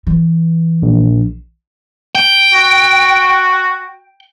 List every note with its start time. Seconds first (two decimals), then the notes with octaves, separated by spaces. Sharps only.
0.07 E3
0.82 A#1
2.15 G5
2.54 F#4